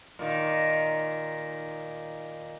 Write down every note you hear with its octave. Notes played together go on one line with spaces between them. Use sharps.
A#2 D#3